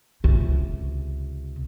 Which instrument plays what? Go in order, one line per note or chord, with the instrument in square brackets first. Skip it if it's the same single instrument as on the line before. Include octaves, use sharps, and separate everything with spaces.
[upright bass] C#2 C3